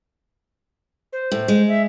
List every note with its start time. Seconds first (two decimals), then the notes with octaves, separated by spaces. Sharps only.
1.13 C5
1.32 A2
1.48 G#3
1.68 E5